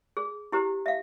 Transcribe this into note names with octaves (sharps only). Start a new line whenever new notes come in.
G#4
E4 G4 C5 A#5
E5 F5